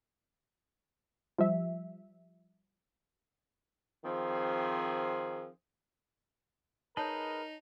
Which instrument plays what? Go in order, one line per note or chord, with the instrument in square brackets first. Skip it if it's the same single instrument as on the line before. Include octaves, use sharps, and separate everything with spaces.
[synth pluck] F3 G3 E5
[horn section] D#3 F3 C4 G#4
[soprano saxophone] D#4 [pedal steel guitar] G#4 B4 D#5 [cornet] A#4 [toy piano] C#5 A5